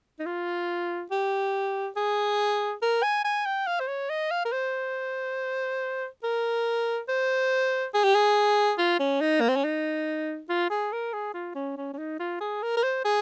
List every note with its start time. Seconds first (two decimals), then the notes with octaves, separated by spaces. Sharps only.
0.19 D#4
0.26 F4
1.11 G4
1.96 G#4
2.82 A#4
3.03 G#5
3.25 G#5
3.46 G5
3.67 F5
3.80 C5
3.88 C#5
4.10 D#5
4.31 F5
4.45 A#4
4.52 C5
6.23 A#4
7.09 C5
7.94 G#4
8.04 G4
8.15 G#4
8.78 F4
8.99 C#4
9.21 D#4
9.41 A#3
9.49 C4
9.56 C#4
9.64 D#4
10.49 F4
10.70 G#4
10.92 A#4
11.13 G#4
11.34 F4
11.55 C#4
11.77 C#4
11.94 C#4
11.98 D#4
12.19 F4
12.41 G#4
12.62 A#4
12.77 A#4
12.83 C5
13.05 G#4